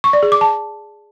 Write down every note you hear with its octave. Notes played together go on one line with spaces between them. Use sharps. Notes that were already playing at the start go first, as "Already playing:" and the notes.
C#6
D5
G#4
D6
A5